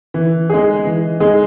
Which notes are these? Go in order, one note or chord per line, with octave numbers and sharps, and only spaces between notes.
E3
G#3 D#4 G#4
E3
G#3 D#4 G#4